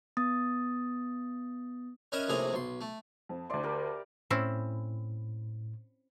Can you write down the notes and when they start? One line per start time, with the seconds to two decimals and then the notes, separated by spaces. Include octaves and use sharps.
0.17 B3 D#6 A6
2.12 C#4 A#4 B4 D#5 E5
2.28 A#1 A2 C3 G#4 A#5
2.53 B1 C6
2.81 A3
3.29 F2
3.50 D2 D5 E5 C6
3.63 G4 A#4 B5
4.30 A2 C4 C#4 E4